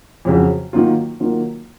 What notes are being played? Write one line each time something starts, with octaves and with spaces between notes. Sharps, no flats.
F2 C#3 F#3
D#3 F#3 A#3 F4
D#3 F#3 A#3 F4